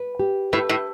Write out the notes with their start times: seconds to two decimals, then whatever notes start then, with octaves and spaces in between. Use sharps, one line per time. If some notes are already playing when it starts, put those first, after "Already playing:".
Already playing: B4
0.19 G4
0.53 A2 B4
0.69 A2